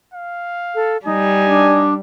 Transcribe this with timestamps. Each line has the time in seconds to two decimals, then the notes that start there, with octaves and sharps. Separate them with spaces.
0.14 F5
0.75 A4
1.05 G3 D#4 G#5
1.47 D4